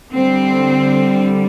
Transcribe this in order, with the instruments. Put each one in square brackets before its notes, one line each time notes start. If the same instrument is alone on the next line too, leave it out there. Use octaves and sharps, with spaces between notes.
[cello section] D3 G3 C4